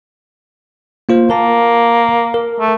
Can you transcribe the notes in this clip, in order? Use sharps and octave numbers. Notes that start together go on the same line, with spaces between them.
A#3 F4 C5
A#3 A#4 A5
A#4
A3